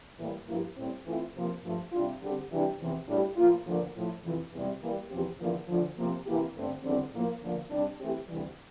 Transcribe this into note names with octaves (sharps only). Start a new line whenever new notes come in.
A2 E3 G3 A#3
G2 F3 A#3 E4 G4
A2 G3 C4
E3 A3 C4 F4
C3 F3 A#3
G2 F3 A3
C3 G3 D4 F4
D3 G3 C4 G4
C3 E3 G3 D4 G4
E2 C3 E3
A2 G3 D4 G4
A2 F3 A#3 F4
D2 D3 F3 A#3
A2 F3 A3
F2 C3 E3
E2 C3 G3
E3 G3 A#3
E2 C3 F3 C4 G4
E2 D3 F3 A#3 E4
D2 D3 F3
C3 F3 A#3
C3 E3 A#3 E4 G4
G2 D3 A3 C4
E2 D3 G3 C4
A2 F3 A#3
D2 D3 F3 A#3
C3 G3 D4
E3 A3 C4 G4
D2 C3 E3 G3